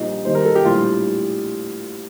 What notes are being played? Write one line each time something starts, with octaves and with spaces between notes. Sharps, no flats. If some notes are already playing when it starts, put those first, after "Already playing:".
Already playing: A#1 A#2 G3 D#4
D#2 D#3 G3 C5
A#4
A4
G4
A#1 A2 G3 F4